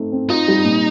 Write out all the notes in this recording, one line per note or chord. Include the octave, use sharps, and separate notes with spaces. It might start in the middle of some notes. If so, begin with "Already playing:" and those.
Already playing: A3 C4 D#4
C4
D#4 F4
G3
A#2